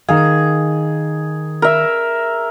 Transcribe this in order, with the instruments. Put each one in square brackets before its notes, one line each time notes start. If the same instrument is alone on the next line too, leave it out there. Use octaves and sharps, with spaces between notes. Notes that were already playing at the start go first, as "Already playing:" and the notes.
[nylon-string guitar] D#3 F5 [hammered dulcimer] G#4
[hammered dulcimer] A#4 E5